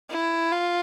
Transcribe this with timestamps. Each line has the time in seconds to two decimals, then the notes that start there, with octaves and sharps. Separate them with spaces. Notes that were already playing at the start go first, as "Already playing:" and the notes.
0.10 E4
0.52 F4